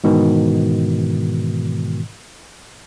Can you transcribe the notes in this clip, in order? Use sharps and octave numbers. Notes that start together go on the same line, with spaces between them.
G#2 B2 D#3 E3